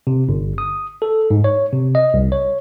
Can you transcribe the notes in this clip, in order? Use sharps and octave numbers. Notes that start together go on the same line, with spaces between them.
C3
G1
D#6
A4
G#2
C#5
C3
D#5
C2
C#5